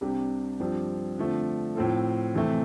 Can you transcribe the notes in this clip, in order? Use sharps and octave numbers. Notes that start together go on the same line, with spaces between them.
C2 C3 G3 D4 G4
G2 F3 C4 G4
F2 D3 F3 A3
A2 F3 C4 F4 A4
F2 C3 E3 A3 C4